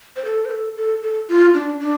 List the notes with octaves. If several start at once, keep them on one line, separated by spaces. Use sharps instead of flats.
C5
A4
C5
A4
A4
A4
F4
D4
D4